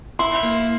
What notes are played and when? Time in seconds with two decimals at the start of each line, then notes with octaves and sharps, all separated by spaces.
0.19 E4 C6
0.43 A#3